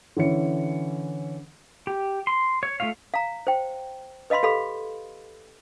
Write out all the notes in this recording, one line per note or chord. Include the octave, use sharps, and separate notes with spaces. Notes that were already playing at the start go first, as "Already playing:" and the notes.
D3 E3 C#4 C#7
G4
C6
C#5
A3 C#4 F4 C#5 F5
F5 A#5
C5 G5
B4 D#5 F5 B5 C6
G4 A4 F5 B5